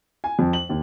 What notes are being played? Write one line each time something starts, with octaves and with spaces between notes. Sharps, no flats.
G#5
F2
F#7
D#2